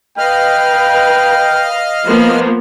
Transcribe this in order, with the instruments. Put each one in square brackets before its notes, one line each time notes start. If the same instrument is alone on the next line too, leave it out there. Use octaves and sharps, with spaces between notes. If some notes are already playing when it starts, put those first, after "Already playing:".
[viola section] B4 [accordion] D#5 F5 F6 [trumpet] G5
[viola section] F3 A#3 B3